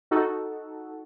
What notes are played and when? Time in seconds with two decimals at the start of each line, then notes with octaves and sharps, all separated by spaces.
0.11 D#4 F#4 A4